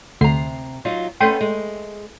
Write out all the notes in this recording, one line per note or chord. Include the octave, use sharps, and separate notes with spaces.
D2 C3 A#5 C7
F#3 D#4 F4
A3 B3 C#4 G5 C6 D#7
G#3